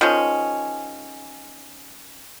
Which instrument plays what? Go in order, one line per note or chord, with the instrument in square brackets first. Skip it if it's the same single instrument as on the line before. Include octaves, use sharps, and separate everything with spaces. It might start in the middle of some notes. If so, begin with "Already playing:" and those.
[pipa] D#3 F3 G#3 C#4